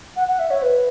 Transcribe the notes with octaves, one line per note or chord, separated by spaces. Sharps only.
F#5
F#5
E5
C#5
B4